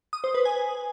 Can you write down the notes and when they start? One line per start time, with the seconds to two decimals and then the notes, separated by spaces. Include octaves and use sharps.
0.13 D#6
0.24 C5
0.35 B4
0.45 G#5